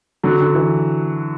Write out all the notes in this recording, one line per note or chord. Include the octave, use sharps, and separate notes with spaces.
D3 F#3
D3
E3